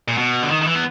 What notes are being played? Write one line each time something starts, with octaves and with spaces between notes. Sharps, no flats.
A#2
B2
D3
D#3
D#3
E3
B3